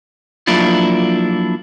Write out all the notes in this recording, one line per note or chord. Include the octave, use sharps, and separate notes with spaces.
F3 F#3 A#3 D4 E4 F4